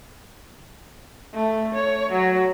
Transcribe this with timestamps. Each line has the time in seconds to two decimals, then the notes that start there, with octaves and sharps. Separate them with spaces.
1.34 A3
1.75 C#5
2.12 F#3